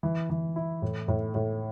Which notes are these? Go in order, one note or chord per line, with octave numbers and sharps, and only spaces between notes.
E3
E3
E4
A2
A2
A2